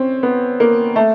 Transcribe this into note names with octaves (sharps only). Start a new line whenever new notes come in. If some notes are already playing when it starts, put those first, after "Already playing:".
Already playing: C4 C#4
B3
A#3
A3